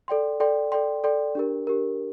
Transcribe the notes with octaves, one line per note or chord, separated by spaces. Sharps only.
A4 D5 G5 C6
A4 D5 G5 C6
A4 D5 G5 C6
A4 D5 G5 C6
D4 G4 A#4
D4 G4 A#4